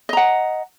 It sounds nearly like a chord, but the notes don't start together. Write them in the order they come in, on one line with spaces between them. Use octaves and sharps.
D#5 A#5 F#5